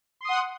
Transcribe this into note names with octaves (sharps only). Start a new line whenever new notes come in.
F#5 C6 D#6